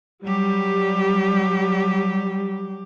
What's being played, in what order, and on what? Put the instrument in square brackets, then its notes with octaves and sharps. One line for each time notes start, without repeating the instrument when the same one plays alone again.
[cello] F#3 G4 [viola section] G3